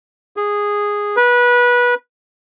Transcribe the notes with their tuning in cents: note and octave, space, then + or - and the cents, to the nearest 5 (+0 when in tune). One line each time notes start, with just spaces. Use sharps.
G#4 -10
B4 -20